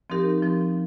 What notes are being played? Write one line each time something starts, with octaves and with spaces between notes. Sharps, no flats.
F3 C4 D#4 G4 A#4
F3 C4 G4